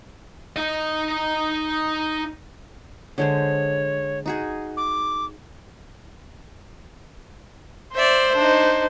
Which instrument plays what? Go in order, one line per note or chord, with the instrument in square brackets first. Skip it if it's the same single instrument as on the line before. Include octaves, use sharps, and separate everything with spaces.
[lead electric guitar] D#4 D#5
[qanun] D3 G#3 C5 [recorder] C#5
[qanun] D#4 F#4 G#4
[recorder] D6
[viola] C5 [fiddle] D5 E5
[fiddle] D4 D#4